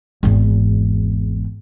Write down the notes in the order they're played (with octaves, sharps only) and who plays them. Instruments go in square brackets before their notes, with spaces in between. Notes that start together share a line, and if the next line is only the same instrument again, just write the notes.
[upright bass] G#1 E2